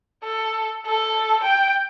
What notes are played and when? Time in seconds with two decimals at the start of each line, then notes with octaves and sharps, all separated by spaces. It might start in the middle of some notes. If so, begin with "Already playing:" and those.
0.24 A4
0.86 A4
1.44 G5